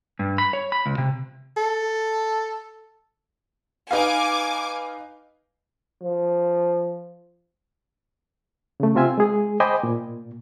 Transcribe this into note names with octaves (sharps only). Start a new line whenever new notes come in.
G2
B5
C#5
B5
C#2
C3
A4
D#4 B4 F5 G#5 D6
F3
C#3 A3
C3 C4 F4 E5 G#5
G#3 G#4
C5 D#5 G5 G#5 B5 D6
A#2